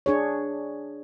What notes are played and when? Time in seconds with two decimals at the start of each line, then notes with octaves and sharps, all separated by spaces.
0.06 D4 G#4 C#5